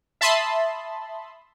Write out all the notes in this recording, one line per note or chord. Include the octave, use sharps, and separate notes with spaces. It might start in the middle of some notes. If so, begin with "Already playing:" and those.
E5 A5 B5 C6 D#6